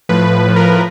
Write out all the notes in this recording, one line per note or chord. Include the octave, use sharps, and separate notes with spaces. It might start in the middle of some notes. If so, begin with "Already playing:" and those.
A2 F3 B4
A2 F3
A#4
A#4